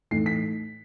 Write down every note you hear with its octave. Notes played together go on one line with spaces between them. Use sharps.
A2 E3 A3 D#4 C7
B6